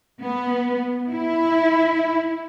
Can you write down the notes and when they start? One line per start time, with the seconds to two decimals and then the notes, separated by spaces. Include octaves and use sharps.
0.21 B3
1.10 E4